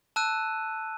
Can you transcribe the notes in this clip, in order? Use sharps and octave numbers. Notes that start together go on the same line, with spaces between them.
A5 E6 F#6 D#7